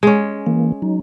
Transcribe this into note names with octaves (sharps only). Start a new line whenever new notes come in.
G#3 C#4
E3 A#3
F#3 D#4